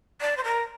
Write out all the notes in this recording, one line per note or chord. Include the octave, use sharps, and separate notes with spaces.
D5
C5
A#4